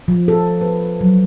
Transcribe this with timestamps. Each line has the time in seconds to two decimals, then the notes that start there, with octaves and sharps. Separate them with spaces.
0.08 F3
0.28 A4
0.61 B4
1.01 F#3